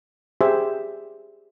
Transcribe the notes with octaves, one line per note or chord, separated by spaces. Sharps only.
G4 G#4 C5 E5